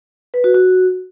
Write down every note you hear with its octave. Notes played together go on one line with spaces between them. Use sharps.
B4
F#4
F#4